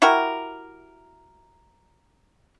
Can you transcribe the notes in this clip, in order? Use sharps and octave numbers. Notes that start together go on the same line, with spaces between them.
E4 F#4 G4 A#4